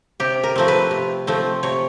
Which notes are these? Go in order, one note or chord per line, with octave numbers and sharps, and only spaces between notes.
C3 G4
A#4
F3 A3 C4
B4
C3
F3 A3 C4
C3 C#5